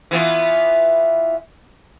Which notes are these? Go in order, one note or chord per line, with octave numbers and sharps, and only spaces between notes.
E3 B3 F4